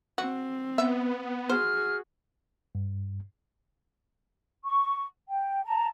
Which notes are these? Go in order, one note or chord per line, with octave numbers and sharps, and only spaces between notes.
C4 F#4
B3 E5
F#4 G#4 C5 F6
G2
C#6
G5
A5 A#5